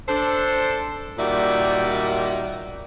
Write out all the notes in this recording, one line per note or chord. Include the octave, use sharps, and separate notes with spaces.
D4 A4 C5
A#2 D#3 G3 F#4 D5 E5